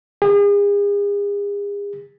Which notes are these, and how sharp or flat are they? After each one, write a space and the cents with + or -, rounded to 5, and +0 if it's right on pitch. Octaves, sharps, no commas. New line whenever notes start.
G#4 -40